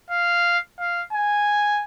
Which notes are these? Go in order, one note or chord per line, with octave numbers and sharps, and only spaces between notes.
F5
F5
G#5